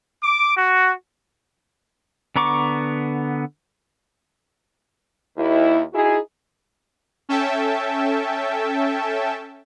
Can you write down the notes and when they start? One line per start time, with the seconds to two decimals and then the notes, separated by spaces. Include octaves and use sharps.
0.23 D6
0.55 F#4
2.36 D3 B3 A#5 C#6 D6
5.37 D#2 E4
5.93 D#4 E4 F#4 G#4
7.29 C#4 A4 E5 G5 A5